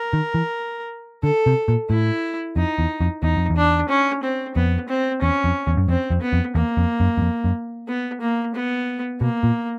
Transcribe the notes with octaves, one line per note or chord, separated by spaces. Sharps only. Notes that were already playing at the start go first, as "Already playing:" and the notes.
Already playing: A#4
D#3
E3
D3 A4
C3
A#2
A2 E4
F2 D#4
E2
F2
E2 D#4
F2
E2
D4
C#4
C4
F2 B3
C4
E2 C#4
F2
E2
F#2
F2 C4
F2
B3
F2
E2 A#3
F2
F#2
F#2
F2
F#2
B3
A#3
B3
B2 A#3
A#2